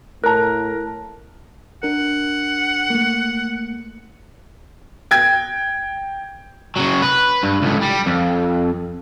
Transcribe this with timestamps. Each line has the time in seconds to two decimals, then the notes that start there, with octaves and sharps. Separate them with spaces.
0.24 A2 A#4 A5 A#5 F#6
1.83 D4 A#4 F#5
2.90 A3 A#3
5.11 G5 G#6
6.77 C#3 F#3
7.02 B4
7.43 G2
7.62 C#2 A2
7.81 G3
8.06 F2